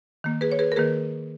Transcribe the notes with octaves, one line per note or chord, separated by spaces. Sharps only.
D#3 A#3
G#4 B4
C#5
G#4 B4
A#4
D#3 A#3 G#4 B4